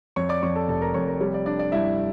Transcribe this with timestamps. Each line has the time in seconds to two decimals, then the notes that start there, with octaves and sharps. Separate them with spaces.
0.16 F2 C#5 C#6
0.29 D5 D6
0.43 F2 C#5 C#6
0.55 A4 A5
0.68 F1 A4 A5
0.82 A#4 A#5
0.94 F2 C#5 C#6
1.08 A#4 A#5
1.20 G3 C#5
1.34 D5
1.46 D4 D5
1.59 D5
1.72 G2 E4 E5